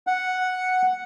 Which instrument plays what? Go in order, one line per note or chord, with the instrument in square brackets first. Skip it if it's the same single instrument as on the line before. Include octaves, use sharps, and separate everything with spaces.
[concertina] F#5